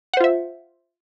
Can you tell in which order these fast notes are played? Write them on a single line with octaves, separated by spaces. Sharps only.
F#5 C5 F4 E5